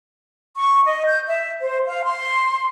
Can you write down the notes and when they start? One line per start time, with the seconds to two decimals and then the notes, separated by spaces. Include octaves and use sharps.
0.57 C#6
0.86 D#5
1.07 G6
1.26 E5
1.62 C5
1.87 F5
2.04 C6